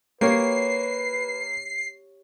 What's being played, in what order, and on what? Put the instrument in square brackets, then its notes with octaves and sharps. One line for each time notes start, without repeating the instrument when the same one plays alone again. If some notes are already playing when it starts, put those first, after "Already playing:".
[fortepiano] A#3 [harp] G4 C#5 [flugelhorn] B4 [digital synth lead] C7